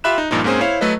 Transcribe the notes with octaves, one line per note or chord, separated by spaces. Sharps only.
F4 G4 E5 B5 F#6 E7
D#4
G2 A#2 F3 D#4
G#2 A#3 C4 C#4 G#4 C5
E4 C5 C#5 F5
F#3 A3 A4 B4 D#5